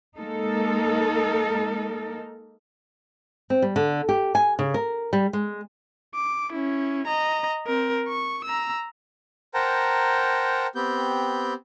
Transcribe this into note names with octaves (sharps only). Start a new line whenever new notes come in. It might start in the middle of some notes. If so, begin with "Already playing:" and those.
G#3 A#3 D#4 A4 A#4
C4
G3
D3
G4
G#5
C#3
A#4
G3
G#3
D6
C#4 E4
D#5 A#5
C4 A#4
C#6
A#5 E6
A#4 C5 F#5 G5 A5 A#5
B3 C4 G4 G6